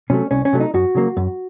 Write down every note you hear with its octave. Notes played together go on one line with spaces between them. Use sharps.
C3 F#3 A3 C#4
C2 C#4
C#4
C3 F#3 A3
D#4
F#2 F#4
C#3 F#3 A#3
F#2